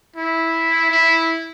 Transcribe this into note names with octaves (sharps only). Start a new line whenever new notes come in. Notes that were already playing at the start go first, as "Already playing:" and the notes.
E4
E4